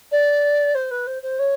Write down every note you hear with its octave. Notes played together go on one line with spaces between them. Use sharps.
D5
C5
B4
C5
C5
C#5